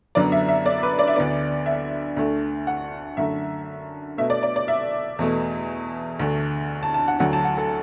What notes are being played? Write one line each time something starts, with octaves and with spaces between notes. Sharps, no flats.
F#2 D3 F#3 B3 D5
E5
E5
D5
B4
D5
E5
D2 D3 B3 D5
E5
D2 D3 A3
F#5
F#2 D3 A3 E5
B2 A3 E5
D5
D5
D5
E5
E2 B2 A3
D2 D3 A3
A5
A5
F#5
D2 D3 F#3 A3 F#5
A5
F#5
A4